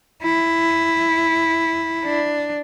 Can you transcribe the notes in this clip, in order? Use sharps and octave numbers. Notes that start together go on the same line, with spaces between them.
E4
D4